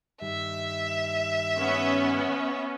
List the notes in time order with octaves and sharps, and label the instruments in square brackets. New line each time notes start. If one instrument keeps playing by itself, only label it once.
[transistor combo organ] G2 D#3 G3 [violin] E5
[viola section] B3 C#4